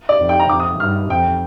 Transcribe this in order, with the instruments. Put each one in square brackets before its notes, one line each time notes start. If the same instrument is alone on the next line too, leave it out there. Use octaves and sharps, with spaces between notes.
[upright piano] D5
[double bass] F2
[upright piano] G5
A#5
[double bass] F2 [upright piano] D6
[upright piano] D#6
[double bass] G2 [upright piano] F6
[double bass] F2 [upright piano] G5